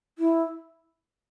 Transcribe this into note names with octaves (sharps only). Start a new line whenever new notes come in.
E4